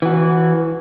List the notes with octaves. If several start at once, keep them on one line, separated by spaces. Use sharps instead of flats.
E3 F#4